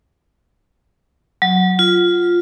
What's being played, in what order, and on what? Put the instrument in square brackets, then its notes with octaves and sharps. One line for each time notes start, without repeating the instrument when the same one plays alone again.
[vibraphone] F#3
F4